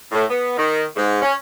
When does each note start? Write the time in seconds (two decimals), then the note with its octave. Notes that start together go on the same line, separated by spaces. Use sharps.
0.11 A2
0.29 B3
0.57 D#3
0.97 G#2
1.22 C#4